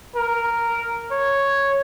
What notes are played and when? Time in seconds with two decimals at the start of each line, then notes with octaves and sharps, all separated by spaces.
0.16 A#4
1.11 C#5